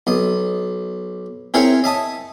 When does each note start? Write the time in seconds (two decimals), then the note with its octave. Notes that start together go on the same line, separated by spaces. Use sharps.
0.07 B1 D#5
1.54 C4 E4 G#4 A#4 C#5
1.84 D#5 E5 A5 D#6